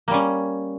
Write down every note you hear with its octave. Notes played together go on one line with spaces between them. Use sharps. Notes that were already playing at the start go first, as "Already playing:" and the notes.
G3 A#3 C#4